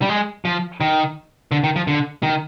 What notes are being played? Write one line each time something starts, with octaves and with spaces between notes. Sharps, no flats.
G3
G#3
F3
D#3
D3
D#3
F3
D3
D#3